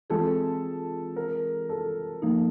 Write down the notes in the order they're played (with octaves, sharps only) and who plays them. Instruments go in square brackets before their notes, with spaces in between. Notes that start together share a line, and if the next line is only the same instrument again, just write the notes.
[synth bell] E3 G#3 C4 F4 G#4 [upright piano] A4
[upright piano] A#4
A4
[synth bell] F3 A#3 D#4